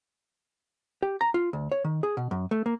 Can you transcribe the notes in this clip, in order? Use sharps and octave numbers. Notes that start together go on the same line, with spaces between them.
G4
A#5
F4
D2
C#5
D#3
G#4
B2
F#2
A3
A#3